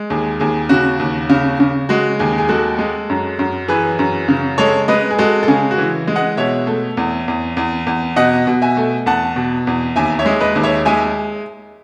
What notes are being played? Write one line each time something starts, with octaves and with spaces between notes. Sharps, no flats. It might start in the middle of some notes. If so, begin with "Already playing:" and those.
Already playing: G#3
D#2 G#4
D#2 G#4
C#3 F#4
D#2
C#3
C#3
G#3 F#4
D#2 G#4
G#4
G#3 F#4 A4
G#3
F#2
F#2
E3 G#4 B4
F#2
C#3
G#3 A4 C#5
G#3 B4 D#5
G#4
G#3 F#4 A4
A4
C#3 G#4
F#4
E3
G#3
D#5 F#5
B2 C#5 E5
A3
E2
E2
E2
E2
B2 D#5 F#5
B2
E5 G#5
A3
E2 F#5 A5
B2
E2
D#2 E5 G#5
C#5 E5
G#3
B4 D#5
D#2
C#5 E5
G#3 E5 G#5